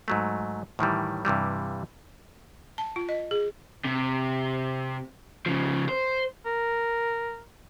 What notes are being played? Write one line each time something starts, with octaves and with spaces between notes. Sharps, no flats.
G#2 F#3 A3
A2 D#3 E3 G3
G2 C3 E3 G3
A5
F4
D#5
G#4
C3
C#3 F3
C5
A#4